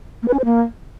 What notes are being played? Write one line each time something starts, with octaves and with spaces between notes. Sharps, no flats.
A#3
B4
C#4
C5
A#3